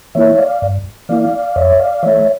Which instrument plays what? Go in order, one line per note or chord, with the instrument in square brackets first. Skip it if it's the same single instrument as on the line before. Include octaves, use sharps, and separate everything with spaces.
[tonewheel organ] E3 A#3 E4 C#5 E5
D5 F5
G2
E3 A#3 E4 D5 F5
F2 C#5 E5
D5 F5
E3 A3 C#5 E5